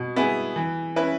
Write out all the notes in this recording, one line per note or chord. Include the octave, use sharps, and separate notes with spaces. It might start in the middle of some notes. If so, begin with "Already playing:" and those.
Already playing: B2
B3 E4 G#4
E3
C#4 E4 B4